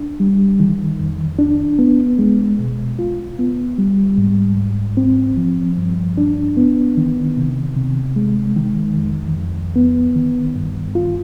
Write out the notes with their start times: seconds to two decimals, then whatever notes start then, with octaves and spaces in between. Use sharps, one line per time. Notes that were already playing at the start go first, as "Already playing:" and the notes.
Already playing: D4
0.20 G3
0.60 D#3
1.00 F2
1.39 D4
1.79 B3
2.19 G#3
2.59 B2
2.99 F4
3.39 B3
3.78 G3
4.17 G#2
4.57 G#2
4.97 C4
5.37 F3
5.78 G2
6.18 D4
6.57 B3
6.97 D#3
7.37 C3
7.77 C3
8.16 G#3
8.57 D#3
8.96 F2
9.36 F2
9.76 B3
10.16 D#3
10.56 G2
10.95 F4